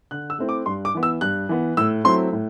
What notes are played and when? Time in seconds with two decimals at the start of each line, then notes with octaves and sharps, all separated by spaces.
0.11 D3 F#6
0.30 E6
0.38 A3 C4 E4
0.49 D6
0.66 G2 C6
0.85 D6
0.95 E3 B3
1.03 E6
1.21 G2 F#6
1.49 E3 B3
1.77 A2 E6
2.04 F#3 A3 C4 E4 C6
2.32 A2